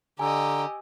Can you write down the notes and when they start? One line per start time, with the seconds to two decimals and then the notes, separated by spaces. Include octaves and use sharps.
0.19 D3 G4 D#5 G#5 A#5 E6